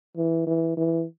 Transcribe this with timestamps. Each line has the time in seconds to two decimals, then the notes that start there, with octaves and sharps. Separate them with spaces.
0.17 E3
0.47 E3
0.77 E3